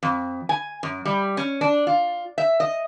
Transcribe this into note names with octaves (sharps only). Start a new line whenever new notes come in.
F2
G#5
F#2
G3
C#4
D4
F4
E5
D#5